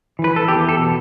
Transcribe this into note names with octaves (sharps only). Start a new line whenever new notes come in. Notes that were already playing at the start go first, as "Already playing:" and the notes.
E3
B4
A4
E2 G4
A4
B2